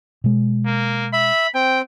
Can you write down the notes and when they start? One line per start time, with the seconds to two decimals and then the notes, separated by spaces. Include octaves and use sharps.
0.24 B2 G#3
0.66 A#3
1.13 E5 B5
1.55 C4 G5